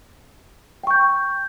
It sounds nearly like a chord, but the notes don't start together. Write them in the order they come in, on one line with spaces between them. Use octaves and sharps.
G5 C#6 G6